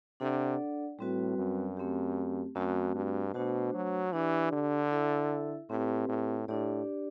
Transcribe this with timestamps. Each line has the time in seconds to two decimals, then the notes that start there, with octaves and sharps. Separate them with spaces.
0.20 C3 D4 A4 D5 F#5
0.99 A2 G3 C4 F#4 B4
1.38 F#2
1.77 A3 C4 G4
2.55 F#2 A3 C4 F#4
2.95 G2
3.34 B2 A3 D4 F#4 C5
3.74 F#3
4.13 E3 D4 G4 D5
4.52 D3
4.91 E4 A4 E5
5.70 A2 C4 G4 B4
6.09 A2
6.48 A2 D4 G4 D5